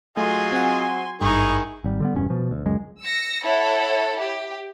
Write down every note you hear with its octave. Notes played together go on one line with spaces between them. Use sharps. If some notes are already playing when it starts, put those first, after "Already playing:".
F#3 A3 F4 G#4 D#5 G#5 C6
C4 F#5
G#1 G2 D#3 D#4 E4 G#4 C#6
G#1 G3
D3 G3 B3
E1 G2 C#4
B2 F3
D2
C#2 F#2 G#3
E6 A#6 C#7
E4 A4 C#5 F#5
G4